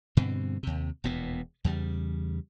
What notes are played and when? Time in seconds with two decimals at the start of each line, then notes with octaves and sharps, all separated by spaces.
0.17 G2 B2 D3 C4
0.63 D#2 C3
1.04 E1 D#2 A#2 B3
1.64 E2 C#3 G3